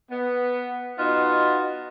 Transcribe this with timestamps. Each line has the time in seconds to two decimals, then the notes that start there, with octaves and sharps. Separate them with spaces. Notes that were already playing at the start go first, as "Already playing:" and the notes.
0.10 B3
0.98 B3 D#4 F4 F#4 D#5